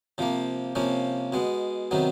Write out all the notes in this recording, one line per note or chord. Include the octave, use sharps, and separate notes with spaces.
C3 F3 A#3
C3 F3 A#3 C#4
B2 G#3 B3
C3 D#3 F#3 B3